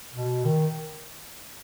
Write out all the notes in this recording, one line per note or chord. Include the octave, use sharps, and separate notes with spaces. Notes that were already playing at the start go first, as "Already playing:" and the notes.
B2
D#3